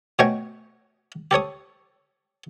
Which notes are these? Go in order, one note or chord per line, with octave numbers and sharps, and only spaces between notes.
B2 A3 C#5 D#5 G5 G#5
G4 A4 C#5 D#6